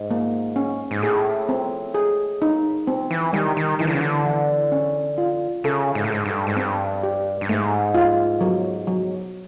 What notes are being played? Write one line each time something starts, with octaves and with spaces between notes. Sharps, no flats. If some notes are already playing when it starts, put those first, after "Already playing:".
Already playing: G#2
A#3
C#4
G#2
A2 G#4
C4
G#4
D#4
C4
E3
D#3 G3
D#3
D#3 E3
D3
C#3
D3
E3
C#4
F4
C#3 A4
G#2
A2
G#2 A4
G2
G#2
G2 C4
G4
G2
G#2 A3
F4
F#3
F#3